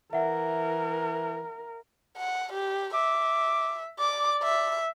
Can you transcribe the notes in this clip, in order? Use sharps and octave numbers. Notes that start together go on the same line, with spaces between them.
E3 A#4 E5 F#5
F#5
G4
E5 D6
D5 D6
E5